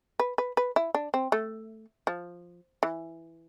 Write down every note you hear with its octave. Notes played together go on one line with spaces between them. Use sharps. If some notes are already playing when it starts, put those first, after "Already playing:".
B4
B4
B4
E4
D4
C4
A3
F3
E3